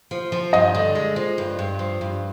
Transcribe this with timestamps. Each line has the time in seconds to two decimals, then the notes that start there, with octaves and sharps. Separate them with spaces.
0.11 F3
0.32 F3
0.53 G2 D#5
0.75 D3
0.95 G#3
1.16 F3
1.38 G2
1.59 G2
1.79 F3
2.01 G2